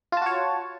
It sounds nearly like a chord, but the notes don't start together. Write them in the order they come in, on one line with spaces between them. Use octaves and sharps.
F4 A5 F#4 C#5